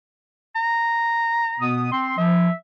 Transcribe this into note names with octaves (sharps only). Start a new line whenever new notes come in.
A#5
B2 B3 D#6
C4 C6
F3 E5